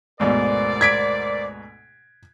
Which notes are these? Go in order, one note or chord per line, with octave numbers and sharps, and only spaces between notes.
D2 G#2 B2 A#4 C5 D5
G#6 B6 D7